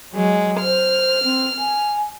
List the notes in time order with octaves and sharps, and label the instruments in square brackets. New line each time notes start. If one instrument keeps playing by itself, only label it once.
[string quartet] F#3 G#3
[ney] C5 [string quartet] F6
[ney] C4
G#5